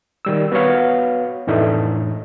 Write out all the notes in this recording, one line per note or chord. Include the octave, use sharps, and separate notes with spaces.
D#3 G3 E6
B3 F#4 B4 C#5 F5
F2 A2 E3 A3 D4 D#4